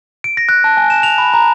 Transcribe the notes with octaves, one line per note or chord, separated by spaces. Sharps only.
D7
A#6
F#6
A5
G#5
E7
F7
B5
A#5